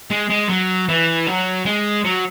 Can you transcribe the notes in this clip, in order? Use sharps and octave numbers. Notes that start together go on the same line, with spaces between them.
G#3
G#3
F#3
E3
F#3
G#3
F#3